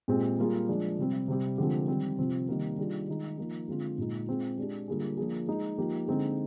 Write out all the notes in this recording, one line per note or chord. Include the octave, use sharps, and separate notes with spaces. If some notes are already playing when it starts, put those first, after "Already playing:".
A#2 G#3 C4 G4
G3 A#3 F4 G#4
F3 G#3 D4
C3 G3 C4
C3 G3 C4 G4
D3 F3 G#3 C4 G4
D#3 G3 C4
C3 F3 C4
C3 D#3 G3 A#3
D#3 G3 D4 F4 G#4
D#3 G#3 D#4
F3 A#3 D#4
D3 G#3 C4 F4
A#2 G#3 D#4
G#3 C4 F4
G#3 D4 G4
D3 G3 A#3 F4 G#4
F3 A#3 D4 F4 G#4
G#3 D#4 G#4
F3 A#3 D#4 G4
D3 G#3 C4 D#4 G#4